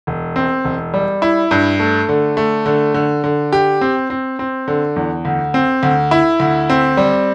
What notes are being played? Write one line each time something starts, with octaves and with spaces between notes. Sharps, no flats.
E1
C4
E1
G3
E4
G2
A3
D3
A3
D3
D3
D3
G4
C4
C4
C4
D3
E2
D2
C4
D2
E4
D2
C4
G3